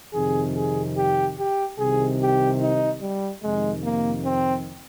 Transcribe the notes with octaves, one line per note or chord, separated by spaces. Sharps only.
F2 C3 D#3 G#4
G#4
G4
G4
C2 C3 D#3 G#4
G4
D#4
G3
F2 C3 D#3 G#3
A#3
C4